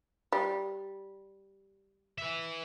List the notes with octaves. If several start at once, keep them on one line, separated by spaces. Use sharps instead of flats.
G3
B4 E5